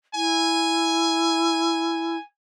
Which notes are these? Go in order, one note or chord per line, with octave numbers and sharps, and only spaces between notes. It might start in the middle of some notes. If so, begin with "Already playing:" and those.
E4 G#5